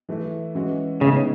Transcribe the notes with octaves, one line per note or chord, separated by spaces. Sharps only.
E3 A3 E4
E3 G#3 C#4 F#4
A2 C#3 G#3 B3 D#4